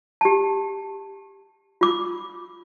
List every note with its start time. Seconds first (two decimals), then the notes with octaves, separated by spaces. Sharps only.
0.21 G4 A5
1.81 F4 D6